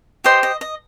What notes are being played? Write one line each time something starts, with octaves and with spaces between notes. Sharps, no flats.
G4 C5 D#5 C6
D#5
D#5